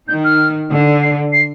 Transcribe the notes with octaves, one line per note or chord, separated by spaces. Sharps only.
D#3 G6
F6
D3
C7
C7